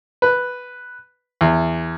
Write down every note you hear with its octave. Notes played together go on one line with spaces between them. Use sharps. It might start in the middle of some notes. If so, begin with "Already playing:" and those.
B4
E2